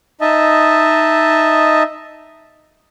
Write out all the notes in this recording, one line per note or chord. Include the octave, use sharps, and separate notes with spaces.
D#4 D#5 E5 A5